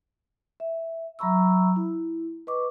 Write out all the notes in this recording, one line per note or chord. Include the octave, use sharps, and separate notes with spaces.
E5
F#3 E5 A#5 B5 C#6 E6
E4
B4 D#5 C#6 D6